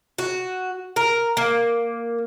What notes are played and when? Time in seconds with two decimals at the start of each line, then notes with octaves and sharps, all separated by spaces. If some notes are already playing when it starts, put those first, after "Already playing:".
0.18 F#4
0.96 A#4
1.37 A#3